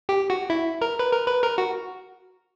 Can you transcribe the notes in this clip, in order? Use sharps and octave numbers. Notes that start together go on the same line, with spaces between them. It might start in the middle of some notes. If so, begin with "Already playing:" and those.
G4
F#4
E4
A#4
B4
A#4
B4
A#4
F#4